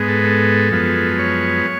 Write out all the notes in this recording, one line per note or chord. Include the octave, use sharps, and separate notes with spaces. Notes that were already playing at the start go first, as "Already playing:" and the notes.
Already playing: G#2 G#3 B3
A4
A4
F#2 F3 G#3 B3
C#5